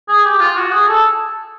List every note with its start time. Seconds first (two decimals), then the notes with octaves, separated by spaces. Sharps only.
0.08 G#4
0.25 G4
0.41 F4
0.56 F#4
0.72 G#4
0.88 A4